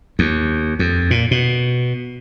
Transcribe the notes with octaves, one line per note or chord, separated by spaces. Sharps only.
D#2
F2
A#2
B2